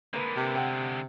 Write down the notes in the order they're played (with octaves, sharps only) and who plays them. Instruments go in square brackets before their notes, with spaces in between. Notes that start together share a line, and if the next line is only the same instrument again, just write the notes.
[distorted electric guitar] D3 G#3 [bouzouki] A#3 B4
[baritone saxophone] C3
[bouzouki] F#5 G5